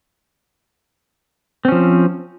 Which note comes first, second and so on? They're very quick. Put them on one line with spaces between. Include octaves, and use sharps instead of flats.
C4 C#4 F3